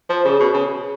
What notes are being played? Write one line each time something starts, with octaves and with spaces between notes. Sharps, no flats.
F3
C#3 G#4 C#5 F5
B2
C#3